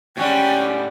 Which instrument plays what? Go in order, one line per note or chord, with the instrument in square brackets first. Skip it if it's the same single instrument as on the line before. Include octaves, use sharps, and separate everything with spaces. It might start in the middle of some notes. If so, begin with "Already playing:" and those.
[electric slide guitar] A2 F#5 [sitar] G3 G#3 F#4 [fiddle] C#4 [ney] G5